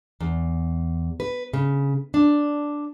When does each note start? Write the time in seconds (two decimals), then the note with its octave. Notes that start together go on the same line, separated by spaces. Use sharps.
0.20 E2
1.20 B4
1.53 C#3
2.14 D4